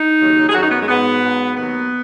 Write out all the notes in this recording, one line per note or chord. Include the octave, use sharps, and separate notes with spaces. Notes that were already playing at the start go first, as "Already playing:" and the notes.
Already playing: D#4
D#2 C#3 F#3
G#4
F#2 D#3 F#3 F#4
D#4
B3
G#3
G#2 F#3 B3
G#2 F#3
D#2 D#3 F#3 B3